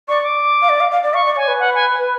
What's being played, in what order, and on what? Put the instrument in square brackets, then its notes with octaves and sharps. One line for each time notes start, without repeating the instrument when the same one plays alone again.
[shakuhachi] D5 [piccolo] C#6
[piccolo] D6
[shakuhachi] F5
D5
F5
F5
D5
[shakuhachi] F5 [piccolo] C#6
[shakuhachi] D5
[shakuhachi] C#5 [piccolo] G#5
[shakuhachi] B4
[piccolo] F#5
G#5